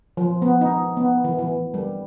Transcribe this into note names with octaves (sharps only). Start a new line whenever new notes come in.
F3
B3
D#4
B3
E3
E3
G3